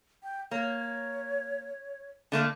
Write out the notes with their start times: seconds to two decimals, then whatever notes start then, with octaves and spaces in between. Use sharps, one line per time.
0.23 G5
0.51 A#3 C#5
2.32 D3 A3 A#3